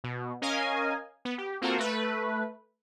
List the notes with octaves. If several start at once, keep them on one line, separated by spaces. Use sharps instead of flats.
B2
C#4 A#4 D#5 F5 G#5
B3
G4
A#3 C4 F4 F#4 A4 A#4
A3 B4